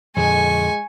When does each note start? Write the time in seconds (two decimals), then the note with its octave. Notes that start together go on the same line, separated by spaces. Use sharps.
0.16 F2 A#2 D3 G#3 G#5 C#6